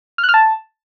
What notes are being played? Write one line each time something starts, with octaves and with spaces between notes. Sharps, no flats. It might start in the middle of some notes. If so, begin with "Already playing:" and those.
F6
F#6
F6
A5